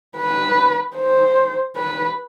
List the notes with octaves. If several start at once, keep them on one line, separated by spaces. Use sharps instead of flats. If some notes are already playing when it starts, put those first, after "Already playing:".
B4
C5
B4